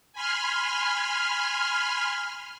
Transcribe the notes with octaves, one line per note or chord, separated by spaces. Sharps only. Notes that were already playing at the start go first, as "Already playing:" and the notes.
G#5 B5 C6 F6